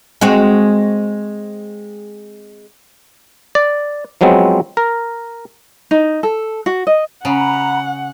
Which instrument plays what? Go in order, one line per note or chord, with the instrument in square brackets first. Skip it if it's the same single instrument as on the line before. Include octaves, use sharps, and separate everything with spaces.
[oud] G#3 C4 F#4
[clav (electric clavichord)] D5
F3 F#3 G#3 B3 C4
A#4
[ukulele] D#4
A4
F#4
D#5
[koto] C#3 [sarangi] F#5 [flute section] A#5 B5